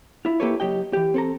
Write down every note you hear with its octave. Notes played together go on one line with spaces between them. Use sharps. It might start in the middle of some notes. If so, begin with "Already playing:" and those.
E4 F4
A#3 E4 G4 A4 B4 C#5
C#2 F#3 G4 D#5 G5
E3 G4
C4 A4 A#5